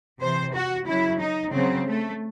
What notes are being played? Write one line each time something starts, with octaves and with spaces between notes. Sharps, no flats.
C3 E3 C5
F#4
C#3 F#3 E4
D#4
C#3 F#3 C4
A3